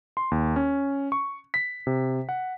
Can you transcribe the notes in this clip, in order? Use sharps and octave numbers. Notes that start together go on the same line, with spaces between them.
C6
D#2
C#4
C#6
B6
C3
F#5